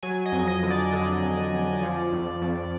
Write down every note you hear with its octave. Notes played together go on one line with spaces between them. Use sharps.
F#3 G#5
D#5
F2
D#5
D3
D5
D3
F2
F2
F3
F2
F2